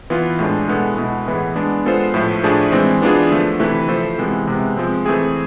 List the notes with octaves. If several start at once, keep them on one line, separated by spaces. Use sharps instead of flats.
E3 B3 F4
A2 G#3 D4
B2 G#3 B3 E4 A4
B2 G#3 B3 E4
A2 E3 B3 E4 G#4
G#3 B3 D4
G#3 B3 F4 A4 C5
A2 F3 A3
A2 F3 A3 D4 G#4
E3 G#3 C4
E3 B3 D4 F4 G#4
D3 F3 A3
C3 E3 A3 E4 B4
F3 A3 E4 A4 C5
C3 E3 G#3 B3
C3 G#3 B3
F3 G#3 C4
E3 A3 C4 G#4